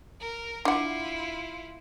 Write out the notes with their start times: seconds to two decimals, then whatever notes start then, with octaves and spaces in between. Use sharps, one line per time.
0.20 A#4
0.65 D4 E4 F4 F#5